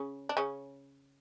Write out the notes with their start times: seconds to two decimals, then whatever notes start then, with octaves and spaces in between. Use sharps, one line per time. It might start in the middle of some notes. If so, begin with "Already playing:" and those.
Already playing: C#3 C#4
0.29 D4
0.37 C#3 C#4